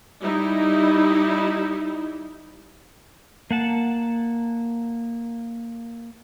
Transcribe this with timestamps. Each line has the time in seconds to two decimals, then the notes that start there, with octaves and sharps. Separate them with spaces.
0.22 G3 D#4 E4
3.51 A#3 F#5 A5